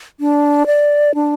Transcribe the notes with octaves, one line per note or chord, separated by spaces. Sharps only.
D4
D5
D4